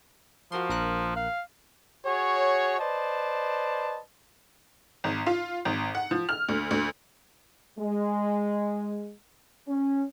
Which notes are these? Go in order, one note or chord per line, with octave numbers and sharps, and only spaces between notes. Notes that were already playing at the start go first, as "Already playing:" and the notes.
F3 F#4 A#4 C6
A#1 A#4 F#6
F5
F#4 G#4 C#5
B4 C5 D5 D#5 A5
G#1
F4
G#1
F#5
F3
F6
D2
D2
G#3
C#4